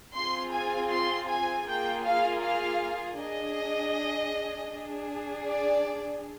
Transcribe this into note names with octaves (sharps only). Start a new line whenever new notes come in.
C4 F4 G#4 C6
G#5
C6
G#5
A#3 F4 G#4 G5
F5
F5
D4 G#4 D#5
D4 G#4
D5